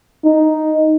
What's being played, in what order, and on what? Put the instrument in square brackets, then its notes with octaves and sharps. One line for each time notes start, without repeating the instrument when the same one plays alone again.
[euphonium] D#4